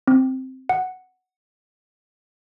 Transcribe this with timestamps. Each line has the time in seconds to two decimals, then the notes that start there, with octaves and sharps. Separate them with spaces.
0.08 C4
0.69 F#5